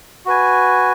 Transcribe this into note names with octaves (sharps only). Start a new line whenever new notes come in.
F#4 B4 G#5